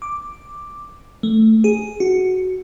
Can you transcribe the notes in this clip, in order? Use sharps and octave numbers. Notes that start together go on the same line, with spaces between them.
D6
A3
G#4
F#4